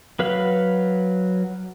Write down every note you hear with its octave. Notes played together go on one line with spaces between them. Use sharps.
F#3 B4 F5 F#5